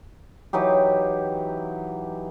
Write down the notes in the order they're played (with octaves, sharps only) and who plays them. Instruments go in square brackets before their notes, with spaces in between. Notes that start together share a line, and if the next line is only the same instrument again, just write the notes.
[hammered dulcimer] E3 F#3 D#4 G4